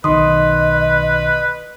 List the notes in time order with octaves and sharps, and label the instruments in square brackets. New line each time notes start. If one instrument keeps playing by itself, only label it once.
[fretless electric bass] B1 D#3 [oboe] B4 [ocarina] D#5 [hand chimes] C6 D#6